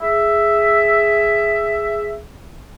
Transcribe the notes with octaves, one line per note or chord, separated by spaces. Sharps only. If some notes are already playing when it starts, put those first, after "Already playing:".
G#4 E5